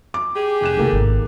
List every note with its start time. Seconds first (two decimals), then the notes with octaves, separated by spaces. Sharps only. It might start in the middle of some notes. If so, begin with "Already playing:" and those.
0.14 D6
0.35 G4 G#4
0.61 F1 F#6 E7
0.77 B1 C3 D#3 A#3 A4
0.93 G#1